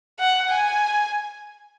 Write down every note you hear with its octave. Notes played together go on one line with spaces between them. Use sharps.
F#5
G#5